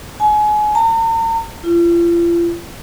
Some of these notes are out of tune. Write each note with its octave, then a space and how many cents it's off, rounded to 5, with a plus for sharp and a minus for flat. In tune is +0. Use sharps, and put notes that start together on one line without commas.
G#5 +30
A#5 -45
F4 -40